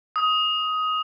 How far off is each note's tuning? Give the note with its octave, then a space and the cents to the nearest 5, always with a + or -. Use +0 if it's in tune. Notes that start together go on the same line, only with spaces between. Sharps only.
D#6 +15